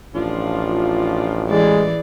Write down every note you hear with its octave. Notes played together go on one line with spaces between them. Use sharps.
A1 F3 D4 F4
E3 G#3 G#4 D5